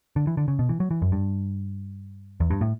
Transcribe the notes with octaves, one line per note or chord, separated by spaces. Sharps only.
D3
E3
D3
C#3
B2
E3
F#3
E3
F#2
G2
E2
G2
A2